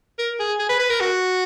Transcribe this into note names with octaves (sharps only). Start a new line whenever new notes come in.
A#4
G#4
G#4
B4
B4
A#4
F#4